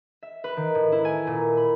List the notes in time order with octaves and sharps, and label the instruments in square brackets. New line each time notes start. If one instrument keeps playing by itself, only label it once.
[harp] E5
B4
D#3
A2
E4
G#5
A#2
B5